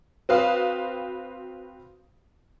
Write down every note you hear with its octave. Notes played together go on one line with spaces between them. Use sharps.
C4 F#4 B4 F5 D#6